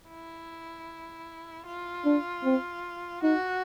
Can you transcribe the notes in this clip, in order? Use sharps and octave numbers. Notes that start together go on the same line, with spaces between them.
E4
F4
D4
C4
D#4 F#4